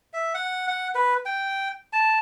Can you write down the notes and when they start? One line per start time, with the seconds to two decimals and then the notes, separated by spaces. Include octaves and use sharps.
0.13 E5
0.34 F#5
0.68 F#5
0.95 B4
1.26 G5
1.93 A5